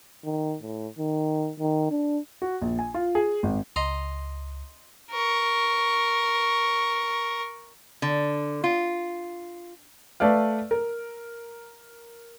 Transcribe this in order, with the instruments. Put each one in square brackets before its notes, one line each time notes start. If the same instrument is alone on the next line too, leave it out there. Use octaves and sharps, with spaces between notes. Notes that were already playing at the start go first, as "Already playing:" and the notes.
[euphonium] D#3
A2
D#3
D#3
D4
[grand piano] F#4
A#1
G#5
F4
G#4
G#1
[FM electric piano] C#2 [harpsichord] D#5 A#5 C6
[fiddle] A#4 C#6
[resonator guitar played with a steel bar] D3
F4
[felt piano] A3 B4 D5 F5
A#4